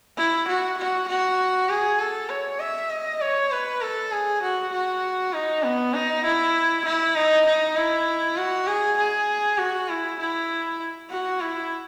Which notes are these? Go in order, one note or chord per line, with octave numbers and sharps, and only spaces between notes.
E4
F#4
F#4
F#4
G#4
A4
C#5
E5
D#5
C#5
B4
A4
G#4
F#4
F#4
D#4
B3
D#4
E4
E4
D#4
D#4
E4
F#4
G#4
G#4
F#4
E4
E4
F#4
E4